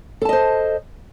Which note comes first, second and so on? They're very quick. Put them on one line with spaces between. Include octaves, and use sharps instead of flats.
A4 A5 D#5 C5